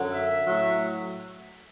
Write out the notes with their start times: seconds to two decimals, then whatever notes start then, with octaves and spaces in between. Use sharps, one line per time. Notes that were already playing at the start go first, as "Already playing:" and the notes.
Already playing: F#2 D3 F#3
0.12 E5
0.46 A2 F#3